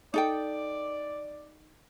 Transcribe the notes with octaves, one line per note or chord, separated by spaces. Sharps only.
D#4 A4 D5 G5